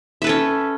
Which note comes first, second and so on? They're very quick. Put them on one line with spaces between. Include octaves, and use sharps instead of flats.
E5 B4 A4 C#4